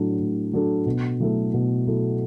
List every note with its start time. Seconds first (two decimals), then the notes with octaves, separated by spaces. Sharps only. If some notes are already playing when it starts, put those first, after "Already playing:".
Already playing: A2 F#3 D4 A4
0.19 A2
0.53 F#3 D4 A4
0.86 B2
1.20 F#3 A3 E4 A4
1.54 B2
1.87 F#3 A3 E4 A4